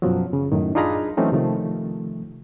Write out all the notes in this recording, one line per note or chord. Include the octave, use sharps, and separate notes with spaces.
F#2 B2 F3 F#3
C#3
F#2 A2 D#3
D4 D#4 F4 G#4 A#5 B5
E3 F#3 A3 C4 C#4 D#4
C3 D#3 F3 A3